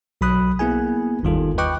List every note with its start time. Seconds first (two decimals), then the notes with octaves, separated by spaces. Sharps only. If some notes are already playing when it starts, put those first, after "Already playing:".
0.21 B1 F#3 B5 D#6 F#6
0.59 A#3 B3 E4 G#4 G#5
1.23 G1 D#2 D#3 G3 F4 A4
1.58 B4 D#5 G5 C#6 D6 F#6